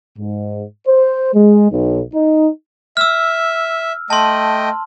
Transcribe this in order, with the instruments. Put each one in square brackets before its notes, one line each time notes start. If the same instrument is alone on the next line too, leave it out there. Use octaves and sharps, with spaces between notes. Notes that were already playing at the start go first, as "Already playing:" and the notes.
[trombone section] G#2
C5
G#3
B1
D#4
[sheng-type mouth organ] E5 [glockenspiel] E6 F6
[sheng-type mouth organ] A3 D#5 G5 [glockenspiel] A5 C6